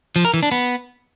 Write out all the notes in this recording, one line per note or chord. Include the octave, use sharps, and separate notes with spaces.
F3
A#4
E3
D4
B3